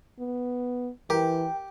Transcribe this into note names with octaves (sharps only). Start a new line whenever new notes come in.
B3
E3 G4 A#4 G5